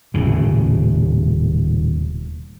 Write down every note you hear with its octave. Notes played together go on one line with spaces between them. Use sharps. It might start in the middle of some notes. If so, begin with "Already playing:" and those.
D#1 A2 C#3